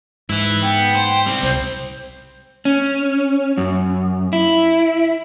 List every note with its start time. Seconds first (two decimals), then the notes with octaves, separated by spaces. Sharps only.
0.30 G#2 E3 E4
0.63 B3 G5
0.95 C5
1.26 G3 C4
1.43 C2 C5
2.65 C#4
3.57 F#2
4.33 E4